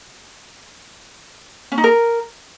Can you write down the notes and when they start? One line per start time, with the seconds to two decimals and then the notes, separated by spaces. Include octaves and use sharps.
1.72 C#4
1.78 D#4
1.84 A#4